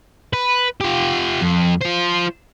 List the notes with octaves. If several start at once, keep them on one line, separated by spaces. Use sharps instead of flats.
B4
F4 G4
F2
F4 C5